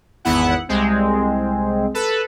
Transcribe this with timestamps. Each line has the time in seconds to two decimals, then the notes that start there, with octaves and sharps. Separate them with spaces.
0.25 G#1 E2 B3 E4 F#5
0.69 C2 G#3 C4
1.94 A4 B4